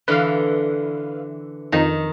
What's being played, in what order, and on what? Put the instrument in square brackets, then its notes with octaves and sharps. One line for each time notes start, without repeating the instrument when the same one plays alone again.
[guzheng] D3 E3 [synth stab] B4 F5
[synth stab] F2 D#4 [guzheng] D#3